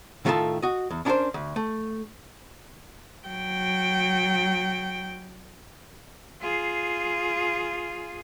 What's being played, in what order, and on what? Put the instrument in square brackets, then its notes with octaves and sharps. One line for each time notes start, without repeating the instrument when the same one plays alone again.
[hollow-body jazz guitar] A2 D#3 A3 F4 A4 A5
F#4 D#5
E2
C#4 D4 E4 G4 A#4 C5
D2
A3
[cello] F#3 G5
F4 G#4